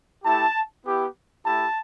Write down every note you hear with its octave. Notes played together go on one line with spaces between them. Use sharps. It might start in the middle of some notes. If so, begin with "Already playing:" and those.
A3 E4 G4 A5
B3 E4 G4
A3 E4 G4 A5